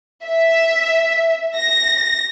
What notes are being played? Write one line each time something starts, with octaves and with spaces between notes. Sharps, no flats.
E5
A#6